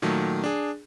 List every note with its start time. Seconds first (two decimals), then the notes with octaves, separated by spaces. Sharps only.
0.02 A#2 D#3 F#3 A3
0.44 D4 G#4